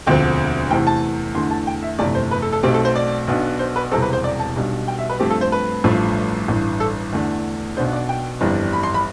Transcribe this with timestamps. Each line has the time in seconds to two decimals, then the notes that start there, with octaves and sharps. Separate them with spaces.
0.06 E1 D2 D3 F3 C4 G5
0.71 E2 C3 E3 A3 G5
0.87 A5
1.35 E2 D3 A3 C6
1.51 A5
1.67 G5
1.83 E5
1.99 G1 F2 C3 E3 A3 D5
2.15 C5
2.31 B4
2.42 A4
2.52 A4
2.63 B1 B2 A3 C4 G4
2.74 A4
2.85 C5
2.96 D5
3.27 B1 B2 B3 D4
3.59 C5
3.76 B4
3.91 E1 E2 C3 G3 C4 A4
4.02 B4
4.13 C5
4.24 D5
4.40 A5
4.55 B1 B2 G3 D4
4.88 G5
4.99 E5
5.10 B4
5.20 G2 F3 A3 C4 G4
5.31 A4
5.41 C5
5.52 B4
5.84 A1 G2 F3 A3
6.48 A1 G2 E3
6.80 A4
7.13 E2 D3 A3 D4
7.77 B1 B2 B3 D4 C5
7.93 D5
8.09 G5
8.41 G1 F2 E3 G3 D4
8.73 B5
8.83 C6
8.94 B5